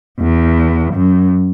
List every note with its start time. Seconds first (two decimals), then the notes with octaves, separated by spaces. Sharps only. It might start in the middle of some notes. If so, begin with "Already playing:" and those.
0.20 E2
0.94 F#2